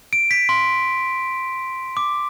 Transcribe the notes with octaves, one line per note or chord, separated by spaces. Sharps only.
D7
B6
C6
D6